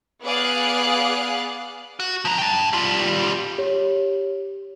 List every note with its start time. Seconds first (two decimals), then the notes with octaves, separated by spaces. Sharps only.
0.23 B3 G#4 D5 F5 F#6
2.00 F#4
2.25 F3 A#5
2.38 G5 A5
2.73 G3 F4
3.58 G4 C#5